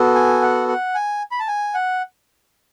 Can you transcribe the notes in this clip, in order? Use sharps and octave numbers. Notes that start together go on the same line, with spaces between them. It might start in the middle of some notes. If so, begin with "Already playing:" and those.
Already playing: B3 F#4 A4
G#5
F#5
F#5
G#5
B5
A5
G#5
F#5